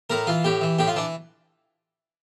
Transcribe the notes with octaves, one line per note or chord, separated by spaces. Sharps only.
A2 A#4
E3 F4
A2 G4
E3
A2 G4
F4
E3 D4